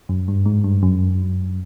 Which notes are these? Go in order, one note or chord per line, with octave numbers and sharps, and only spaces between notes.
F#2
G2
G#2
G2
F#2